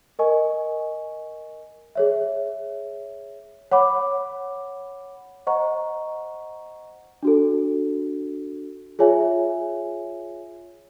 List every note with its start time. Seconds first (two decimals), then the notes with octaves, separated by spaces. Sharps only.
0.19 A#4 D#5 G#5 C#6
1.95 G#4 C#5 E5
3.72 C#5 F#5 B5 D6
5.47 C5 D#5 F#5 A#5 C#6
7.23 D4 F#4 A4
8.99 F4 G#4 C#5 E5 G#5